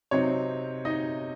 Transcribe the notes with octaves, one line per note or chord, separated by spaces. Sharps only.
C3 F#3 C4 D#4 C#5
D#4 D#5